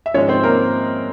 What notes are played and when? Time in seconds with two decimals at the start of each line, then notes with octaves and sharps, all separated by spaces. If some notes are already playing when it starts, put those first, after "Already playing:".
0.06 E5
0.14 G#2 F3 G#3 C#4 C#5
0.29 C4 C5
0.43 A#3 A#4